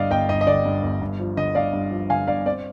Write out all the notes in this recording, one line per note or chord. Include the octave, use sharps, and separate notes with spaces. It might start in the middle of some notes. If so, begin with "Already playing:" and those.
Already playing: G1 G2 D3 D5 D#5 F5
G1 D#5 G5
G1 D#5
D#5
D3 D5
G2
G1
G2
F3
D3 D#5
G2 D5 F5
G2
F3
D3 F5 G#5
G2 D5 F5
C4 D5